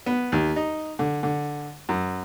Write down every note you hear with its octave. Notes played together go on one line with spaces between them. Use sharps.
B3
D#2
D#4
D3
D3
F#2